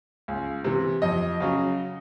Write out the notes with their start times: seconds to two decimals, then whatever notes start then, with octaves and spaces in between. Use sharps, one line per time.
0.28 C#2
0.64 C3 E3
1.02 F2 D#5
1.40 C#3 F#3